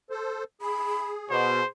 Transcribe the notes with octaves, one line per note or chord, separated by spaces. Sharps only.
A4 C5
G#4 B5
B2 G#4 C5